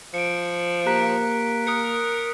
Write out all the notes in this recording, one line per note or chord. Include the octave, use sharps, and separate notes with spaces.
F3 C#7 D7
A#3 G4 A#5 F#6 B6 D7
A#4 D#6 F#6 C#7